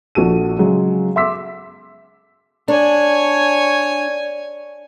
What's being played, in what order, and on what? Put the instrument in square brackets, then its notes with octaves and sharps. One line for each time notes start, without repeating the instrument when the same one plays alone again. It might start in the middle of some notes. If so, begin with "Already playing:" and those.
[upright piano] A#1 F#4 A4 D#7
C#3 F#3 G#3
E5 C6 D6 E6 B6
[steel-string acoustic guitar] D4 [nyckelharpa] C#5 G#5